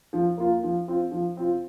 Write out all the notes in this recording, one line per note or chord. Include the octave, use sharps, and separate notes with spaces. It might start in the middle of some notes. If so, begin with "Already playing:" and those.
F3
A#3 F4
F3
C4 F4
F3
C4 F4